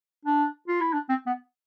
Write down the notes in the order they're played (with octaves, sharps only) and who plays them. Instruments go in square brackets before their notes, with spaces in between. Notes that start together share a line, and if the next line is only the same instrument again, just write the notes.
[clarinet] D4
F4
E4
D4
C4
B3